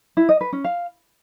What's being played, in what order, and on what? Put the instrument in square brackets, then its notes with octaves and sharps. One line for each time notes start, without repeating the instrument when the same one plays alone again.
[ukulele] E4
D#5
B4
C#4
F5